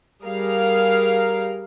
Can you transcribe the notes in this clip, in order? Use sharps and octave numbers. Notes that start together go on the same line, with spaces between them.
G3 G#4 A#4 F5